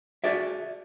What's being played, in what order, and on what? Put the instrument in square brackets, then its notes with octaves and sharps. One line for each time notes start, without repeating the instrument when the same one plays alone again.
[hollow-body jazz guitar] F#4 G#4 D5 E5